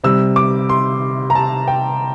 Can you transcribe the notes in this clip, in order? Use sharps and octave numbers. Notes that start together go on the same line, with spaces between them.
C3 G3 E6
D6
C6
A#5
A5
G5